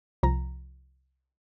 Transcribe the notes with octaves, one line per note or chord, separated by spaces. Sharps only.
C2 F3 A#5 A#6